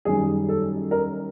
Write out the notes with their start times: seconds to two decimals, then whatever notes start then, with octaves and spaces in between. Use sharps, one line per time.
0.05 F#2 D#3 G3 G#4
0.49 A4
0.91 A#4